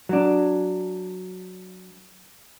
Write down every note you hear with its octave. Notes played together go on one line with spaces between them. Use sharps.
F#3 D4